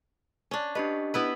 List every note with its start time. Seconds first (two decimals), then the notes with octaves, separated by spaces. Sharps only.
0.51 C#4 D4
0.75 D4 G4 B4 D#5
1.14 B3 E4 B4